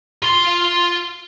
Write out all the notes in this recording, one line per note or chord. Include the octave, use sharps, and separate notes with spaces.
F4 C6